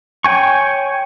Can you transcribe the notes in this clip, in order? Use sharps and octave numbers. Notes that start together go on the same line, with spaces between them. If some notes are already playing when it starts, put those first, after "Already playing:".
C#5 G5 G#5 C#6